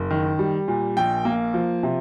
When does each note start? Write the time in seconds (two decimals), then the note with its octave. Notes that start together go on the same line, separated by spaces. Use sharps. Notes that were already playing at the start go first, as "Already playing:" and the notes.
Already playing: F#1
0.10 D#3
0.39 G3
0.68 A#2
0.97 A#1 G5
1.25 A#3
1.54 F3
1.83 C3